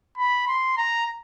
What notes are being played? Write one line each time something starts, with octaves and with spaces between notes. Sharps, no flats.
B5
C6
A#5